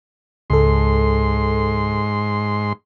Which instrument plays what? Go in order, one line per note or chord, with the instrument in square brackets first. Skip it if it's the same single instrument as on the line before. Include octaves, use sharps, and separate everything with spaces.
[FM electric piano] C#2 A4 [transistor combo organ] G#2 C6